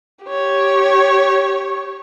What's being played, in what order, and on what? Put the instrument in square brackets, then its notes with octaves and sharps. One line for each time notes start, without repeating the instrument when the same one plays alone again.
[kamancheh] G4 C#5